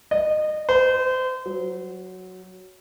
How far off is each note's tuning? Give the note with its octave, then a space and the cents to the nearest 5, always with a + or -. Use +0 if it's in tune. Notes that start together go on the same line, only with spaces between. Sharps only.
D#5 -25
C5 -30
F#3 +0